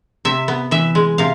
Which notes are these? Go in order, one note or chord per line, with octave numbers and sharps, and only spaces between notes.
C3 E5
B3
E3 E5
G#3
C3 F5